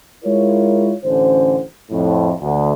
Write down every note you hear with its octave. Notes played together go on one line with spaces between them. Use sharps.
G#3 E4 F4 A#4 C#5
A1 D3 C#4 C5
F2 A2
D2